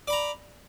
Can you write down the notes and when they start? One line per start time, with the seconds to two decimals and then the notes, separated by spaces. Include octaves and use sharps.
0.08 D5
0.10 B5
0.13 A#5